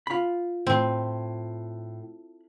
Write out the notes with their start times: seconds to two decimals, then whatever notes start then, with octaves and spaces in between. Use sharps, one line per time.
0.07 F4 B5
0.67 A2 C4